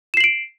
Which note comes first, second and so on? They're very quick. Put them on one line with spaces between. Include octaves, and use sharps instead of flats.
E7 C7 F#7 D7